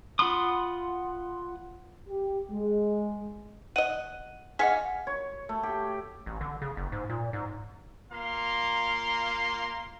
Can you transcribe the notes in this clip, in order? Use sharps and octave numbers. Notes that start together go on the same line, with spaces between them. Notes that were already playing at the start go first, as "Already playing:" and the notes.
F4 F#5 B5 C6 D#6
G4
G#3
D#5 F#5 D#7
G#4 D#5 F5 F#5 B6
C#5
A3
G4
A1
D3
C#3
F#1
G#2
A#2
G#2
A#3 F4 F5 A#5 C6